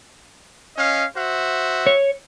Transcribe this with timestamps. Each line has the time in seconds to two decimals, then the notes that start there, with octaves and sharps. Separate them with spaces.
0.76 C#4 D#5 F5
1.16 F#4 C5 E5
1.87 C#5